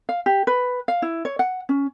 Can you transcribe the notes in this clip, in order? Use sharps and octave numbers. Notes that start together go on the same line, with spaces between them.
F5
G4
B4
F5
E4
C#5
F#5
C#4